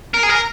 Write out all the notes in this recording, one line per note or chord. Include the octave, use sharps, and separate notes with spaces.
A#4
G#4
A#4